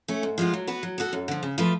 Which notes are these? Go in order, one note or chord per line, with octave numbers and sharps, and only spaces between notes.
A3 C#4
G#2
F3 G#3 B3 F4
F#3
B3 F#4 B4
F#3
B3 F#4 A4
F#2
D3 F3
C#3
F3 A3 F4 B4